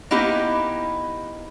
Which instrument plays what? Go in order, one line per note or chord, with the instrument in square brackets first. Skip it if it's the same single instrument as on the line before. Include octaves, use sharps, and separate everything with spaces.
[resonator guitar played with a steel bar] A#3 B3 D#4 E4 G4